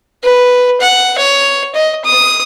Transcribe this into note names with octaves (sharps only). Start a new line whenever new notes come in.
B4
F#5
C#5
D#5
D#6